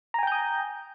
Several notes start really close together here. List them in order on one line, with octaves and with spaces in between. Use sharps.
A#5 G#5 G5 G6 D#6